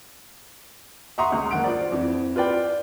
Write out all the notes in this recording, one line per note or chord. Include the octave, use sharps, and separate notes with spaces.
E5 F#5 A#5 C6 C#6 D#6
C#2
F#1 F#5 D7
F4 C5 D5
F2 E3
F4 B4 D5 G5